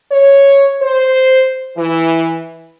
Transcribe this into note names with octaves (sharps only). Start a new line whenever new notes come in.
C#5
C5
E3